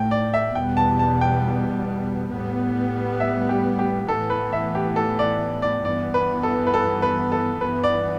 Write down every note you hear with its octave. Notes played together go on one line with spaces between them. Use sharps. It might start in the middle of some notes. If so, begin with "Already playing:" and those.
Already playing: A2 A3 G5
D5
E5
E2 B2 G3 B3 G5
A5
A5
G5
A2 G3 B3
E5
G4
G4
A2 E3 B3 A4
B4
E5
G4
A4
D5
D5
G2 E3 B3 D5
B4
A4
B4
A4
B4
A4
G2 E3 B3 B4
D5